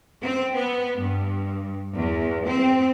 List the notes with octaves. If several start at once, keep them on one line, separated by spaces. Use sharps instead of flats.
C4
B3
G2
E2
C4